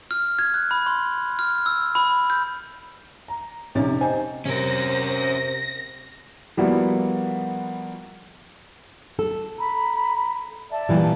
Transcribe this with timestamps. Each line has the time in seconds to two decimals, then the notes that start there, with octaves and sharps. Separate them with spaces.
0.11 F6
0.39 G#6
0.54 F#6
0.71 B5
0.86 C6
1.39 F6
1.66 E6
1.95 B5
2.30 G6
3.28 A#5
3.75 A#1 F2 G#2 C3 C#4 A6
4.01 D#4 G4 C5 G#5
4.45 C3 C#4 A#4 C5 A#6
6.57 F3 G3 A#3 B3 E4 F#4
9.19 A4
9.59 A#5 B5
10.71 D5 E5 A5
10.89 A#2 E3 G3